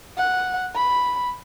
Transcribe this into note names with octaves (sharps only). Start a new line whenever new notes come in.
F#5
B5